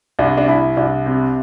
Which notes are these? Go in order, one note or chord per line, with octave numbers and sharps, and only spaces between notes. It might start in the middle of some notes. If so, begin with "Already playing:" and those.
C2 D4
D4
C2 E4
C2 D4
C3